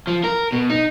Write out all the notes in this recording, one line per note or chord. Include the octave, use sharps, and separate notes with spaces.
F3
A#4
B2
D#4